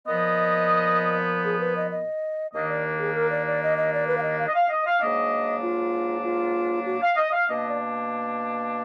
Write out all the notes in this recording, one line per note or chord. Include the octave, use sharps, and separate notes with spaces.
A#2 F3 B3 D#5
G#4
B4
D#5
D#5
D#2 D#3 A#3 D4 D#5
D5
G#4
A#4
D5
D5
D#5
D#5
D5
B4
F5
D#5
F5
D#5
F5
D#5
F5
G#2 F#3 A#3 D4 D#5
F4
F4
F#4
F5
D#5
F5
B2 A#3 D4 D#5
D5